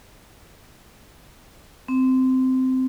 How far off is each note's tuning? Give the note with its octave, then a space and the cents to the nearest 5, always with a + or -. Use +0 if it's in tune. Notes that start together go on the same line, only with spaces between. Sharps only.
C4 -15